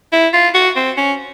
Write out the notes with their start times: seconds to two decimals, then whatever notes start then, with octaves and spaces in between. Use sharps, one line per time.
0.13 E4
0.34 F4
0.55 F#4
0.76 C4
0.98 C#4